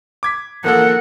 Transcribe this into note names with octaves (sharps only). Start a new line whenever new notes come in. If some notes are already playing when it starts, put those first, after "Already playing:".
D6 G#6 B6
F3 A#3 A4 A#4 F#5